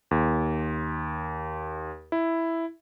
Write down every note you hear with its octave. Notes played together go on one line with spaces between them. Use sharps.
D#2
E4